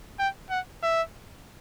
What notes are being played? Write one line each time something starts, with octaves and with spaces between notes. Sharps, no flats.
G5
F#5
E5